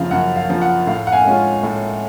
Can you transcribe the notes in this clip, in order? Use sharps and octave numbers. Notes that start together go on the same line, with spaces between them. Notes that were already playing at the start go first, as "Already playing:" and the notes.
Already playing: F#2 C#3 F3 F5
F#2 F#5
F5
C#3 F3
F#5
A2 F5
F#5
F5 G#5
G#3 C#4 F4
A2